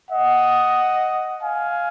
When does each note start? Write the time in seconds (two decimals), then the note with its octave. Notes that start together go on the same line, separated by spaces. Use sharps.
0.11 D#5 F#5
1.42 F5 G#5